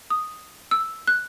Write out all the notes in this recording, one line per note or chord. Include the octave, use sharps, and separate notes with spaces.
D#6
E6
F#6